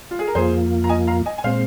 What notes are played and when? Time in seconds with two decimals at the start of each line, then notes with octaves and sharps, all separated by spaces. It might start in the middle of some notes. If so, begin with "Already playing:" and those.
0.11 F4
0.19 G#4
0.27 A#4
0.35 F2 F3 A#3 F4 G#4 C5
0.84 A#5
0.89 D#5 G#5
1.07 F5 A#5
1.26 D#5 G#5
1.38 G#5
1.44 A#2 G#3 C4 C5 F5